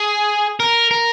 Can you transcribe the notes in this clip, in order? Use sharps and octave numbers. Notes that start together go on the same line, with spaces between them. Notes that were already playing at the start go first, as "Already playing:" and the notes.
Already playing: G#4
A#4
A#4